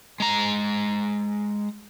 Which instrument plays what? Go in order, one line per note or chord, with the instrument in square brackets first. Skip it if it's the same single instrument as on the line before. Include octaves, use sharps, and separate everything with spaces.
[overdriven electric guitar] G#3 A#5